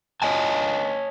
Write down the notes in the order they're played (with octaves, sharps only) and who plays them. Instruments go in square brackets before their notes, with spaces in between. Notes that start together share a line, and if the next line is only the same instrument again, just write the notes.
[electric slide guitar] C#5 D#5 G#5 A5